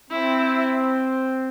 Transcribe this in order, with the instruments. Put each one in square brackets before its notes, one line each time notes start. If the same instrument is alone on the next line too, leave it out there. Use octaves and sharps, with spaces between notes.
[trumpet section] C4 [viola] E4